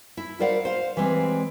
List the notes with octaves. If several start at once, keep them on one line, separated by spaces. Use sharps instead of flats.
E4
A#4 C5 D5 F5 F#5
C5 F5
E3 G3 G#3 C4